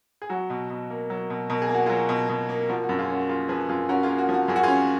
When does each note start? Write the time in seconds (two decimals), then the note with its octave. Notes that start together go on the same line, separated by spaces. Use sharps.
0.22 G#4
0.29 F#3 F#4
0.50 B2
0.70 B2
0.90 A#3
1.10 F#3
1.30 B2
1.50 B2 A#4
1.62 G#4
1.69 A#3
1.75 F#4
1.86 F#3 F4 G#4
2.09 B2
2.29 B2
2.49 A#3
2.69 F3 F#4 A#4
2.84 F#4
2.89 F#2
2.99 F4 G#4
3.09 C#4 F#4
3.29 A#3 F4 G#4
3.48 F3 G#4 B4
3.69 F#2 F4 G#4
3.89 C#4 F#4 A#4
4.03 F4 G#4
4.09 A#3
4.18 F#4
4.29 F3
4.34 F#4
4.48 F#2 G#4
4.56 F#4
4.63 C#4 F4 G#4